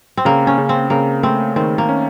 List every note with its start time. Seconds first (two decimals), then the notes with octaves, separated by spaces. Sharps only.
0.17 C4
0.25 C#3 A#3
0.47 C#4
0.58 C#3
0.69 C4
0.90 C#3 A#3
1.23 A3 C4
1.56 D#3 C4
1.78 A#3
1.89 C#4